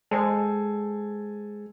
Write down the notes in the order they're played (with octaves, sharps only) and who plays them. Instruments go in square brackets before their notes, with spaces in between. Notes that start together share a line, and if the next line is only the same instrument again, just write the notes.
[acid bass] G#3 [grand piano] A4 C5 G#5